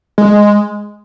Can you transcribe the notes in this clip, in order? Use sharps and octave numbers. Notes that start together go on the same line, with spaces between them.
G#3